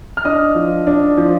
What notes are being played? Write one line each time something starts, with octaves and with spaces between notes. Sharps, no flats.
F6
D4 D#5 D#6
F3
D4
F3